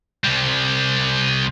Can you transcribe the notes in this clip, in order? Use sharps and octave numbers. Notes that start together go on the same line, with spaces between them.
C2 G3